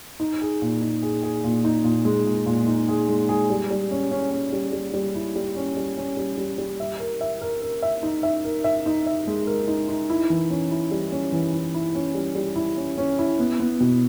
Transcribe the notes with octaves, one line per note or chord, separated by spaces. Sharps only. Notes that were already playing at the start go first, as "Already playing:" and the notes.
D#4
G#4
A#2
D#4
G#4
G#4
A#2
D#4
A#2
G#3
A#2
A#2
D#4
G#4
G#3
G#4
G3
G3
C#4
C#4
C#4
G3
G3
G3
E4
G3
C#4
G3
C#4
G3
G3
G3
E5
A#4
E5
A#4
A#4
E5
D#4
E5
A#4
E5
D#4
E5
G#3
A#4
D#4
D#4
E4
E3
C#4
E4
G3
C#4
E3
E4
E4
C#4
G3
G3
E4
C#4
C#4
E4
B3
B3
B2